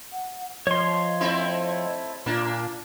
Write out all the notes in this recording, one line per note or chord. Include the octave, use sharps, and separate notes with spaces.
F#5
F3 C#5 D#5 C6
A3 C4 E4
A#2 A#3 D4 F4